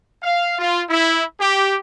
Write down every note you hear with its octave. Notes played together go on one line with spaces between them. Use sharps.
F5
F4
E4
G4